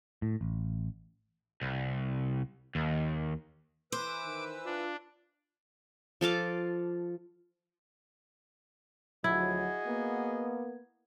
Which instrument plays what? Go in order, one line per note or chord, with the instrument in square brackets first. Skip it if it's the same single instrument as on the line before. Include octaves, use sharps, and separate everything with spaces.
[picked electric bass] A2
A1
[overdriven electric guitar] C2
D#2
[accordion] E3 B4 E6 [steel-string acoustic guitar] C5 [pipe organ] D6
[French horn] D#3
[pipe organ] D4 [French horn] F4
[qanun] F3 A4 F5 D6
[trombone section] D2 F3 F#3 [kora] E4 [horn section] F#4 G#4 D#5 [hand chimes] G#6
[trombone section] A#3 B3